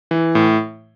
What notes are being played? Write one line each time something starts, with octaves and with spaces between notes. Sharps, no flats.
E3
A2